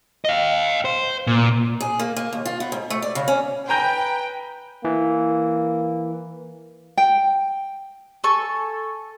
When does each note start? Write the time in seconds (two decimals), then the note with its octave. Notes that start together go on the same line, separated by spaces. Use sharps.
0.25 D#5 F5
0.85 C5
1.27 A#2
1.80 G#4
1.99 A#3
2.16 A#3
2.33 D#2
2.46 F4
2.60 B3
2.72 G#2
2.90 A3
3.02 D5
3.15 C#3
3.28 C#4
3.69 B4 G5 G#5 A#5 G6
4.85 E3 A#3
6.97 G5
8.24 A4 G#5 C#6